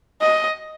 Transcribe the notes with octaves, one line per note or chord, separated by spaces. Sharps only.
D#5